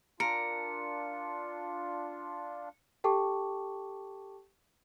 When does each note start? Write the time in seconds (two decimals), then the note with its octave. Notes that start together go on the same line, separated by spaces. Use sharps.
0.20 D4 F4 A#4 C#7
3.04 G4 A4 G5 A5 C#6 D6